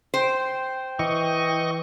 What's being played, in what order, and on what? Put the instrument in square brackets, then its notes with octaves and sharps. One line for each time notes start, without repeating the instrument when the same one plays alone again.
[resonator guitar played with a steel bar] C5 [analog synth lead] G5
[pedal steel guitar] E3 [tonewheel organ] D#5 C#6